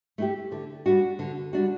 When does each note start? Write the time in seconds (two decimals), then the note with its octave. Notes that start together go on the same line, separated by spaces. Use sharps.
0.18 A3 E4 G4
0.52 D3
0.86 G3 D4 F#4
1.19 D3
1.53 G3 D4 F#4